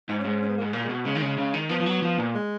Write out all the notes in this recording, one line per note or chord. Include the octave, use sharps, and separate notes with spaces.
G#2 D#4
C#4
G#2
C#4
C#4
B3
A#3
G#2 G#3
A#2 A#3
B2 G#3
C#3 G#3
D#3
C#3
C#3
D#3
F3 B3
F3
F#3
F3
A#2
G#3